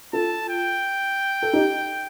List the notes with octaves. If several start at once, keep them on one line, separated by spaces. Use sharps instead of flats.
F4 A4 A5
G5
A4
D#4 G4